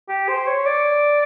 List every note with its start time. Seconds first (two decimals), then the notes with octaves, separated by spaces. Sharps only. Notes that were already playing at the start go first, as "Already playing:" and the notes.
0.09 G4
0.28 C5
0.47 C#5
0.66 D5